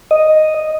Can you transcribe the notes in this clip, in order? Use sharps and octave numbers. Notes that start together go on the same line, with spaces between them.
D#5